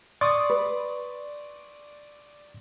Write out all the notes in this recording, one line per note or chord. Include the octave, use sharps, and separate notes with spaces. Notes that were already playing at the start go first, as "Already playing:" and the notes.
D5 C6 C#6 D#6
B4